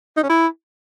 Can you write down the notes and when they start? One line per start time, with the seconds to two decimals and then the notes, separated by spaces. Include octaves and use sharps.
0.17 D#4
0.23 C#4
0.29 E4